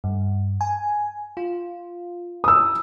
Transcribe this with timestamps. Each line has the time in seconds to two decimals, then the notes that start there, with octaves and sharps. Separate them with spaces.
0.04 G2
0.61 G#5
1.37 F4
2.44 D#6 E6